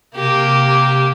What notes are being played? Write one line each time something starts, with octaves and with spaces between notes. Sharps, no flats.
C3 A#3 G4